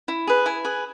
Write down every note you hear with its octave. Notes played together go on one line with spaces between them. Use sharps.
E4
G#4 B4
E4 G#5
G#4 B4